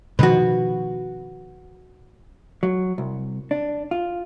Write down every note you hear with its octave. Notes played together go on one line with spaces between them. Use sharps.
B2 D#3 F3 F#4 B4
F#3
C2
D4
F4